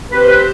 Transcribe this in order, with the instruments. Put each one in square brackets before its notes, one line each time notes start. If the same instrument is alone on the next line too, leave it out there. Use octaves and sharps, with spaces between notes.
[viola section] C4 G4 C5 [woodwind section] B4
[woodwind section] B4